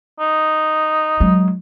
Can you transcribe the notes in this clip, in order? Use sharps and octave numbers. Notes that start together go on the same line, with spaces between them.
D#4
F#3 G#3